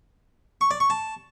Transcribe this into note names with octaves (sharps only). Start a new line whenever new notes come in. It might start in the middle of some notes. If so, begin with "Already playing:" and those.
C#6
D5
C#6
A5